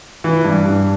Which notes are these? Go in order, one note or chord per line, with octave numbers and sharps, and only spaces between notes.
E3
G2
G2